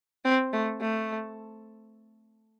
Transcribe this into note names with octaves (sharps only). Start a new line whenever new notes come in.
C4
A3
A3